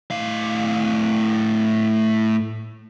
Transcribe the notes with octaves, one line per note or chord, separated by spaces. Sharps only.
A2 F5